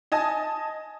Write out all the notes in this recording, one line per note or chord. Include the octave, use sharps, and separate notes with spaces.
D#5 G#5 A5 D#6